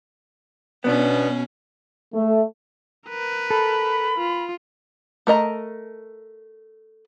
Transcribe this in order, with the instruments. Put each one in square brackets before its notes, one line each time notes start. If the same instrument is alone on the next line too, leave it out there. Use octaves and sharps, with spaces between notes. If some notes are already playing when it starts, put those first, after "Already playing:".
[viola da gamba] B2 C#4 [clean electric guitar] B3 D4
[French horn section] A3
[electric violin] A#4 B4
[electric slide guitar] A4 [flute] B5
[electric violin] F4
[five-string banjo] A3 A#4 D#5 A#5